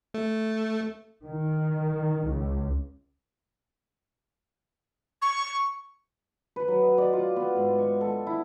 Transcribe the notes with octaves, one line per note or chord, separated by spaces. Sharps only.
A3
D#3
C#2
C#6
B4
F#3
D#5
D5
F4
B3
G#2
C#6
A4
E4